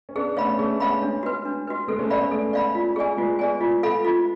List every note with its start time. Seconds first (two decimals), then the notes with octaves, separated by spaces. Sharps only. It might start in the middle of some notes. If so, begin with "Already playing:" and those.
0.09 C#4
0.16 B3 D4 G#4
0.37 A3 C#4 C#5 F5 B5
0.58 A3 C#4 G#4
0.80 G#3 B3 C#5 F5 B5
1.02 G#3 D4
1.23 F#4 B4
1.45 D4
1.67 F#4 B4
1.88 G#3 B3 A4
1.99 A3 C#4
2.10 A3 D5 F5 B5
2.21 A3 C#4
2.31 A4
2.53 D5 F5 B5
2.75 F4
2.96 G#4 D5 G#5
3.17 G#3 B3 F4
3.39 G#4 D5 G#5
3.61 F4
3.83 A4 F5 B5
4.05 F4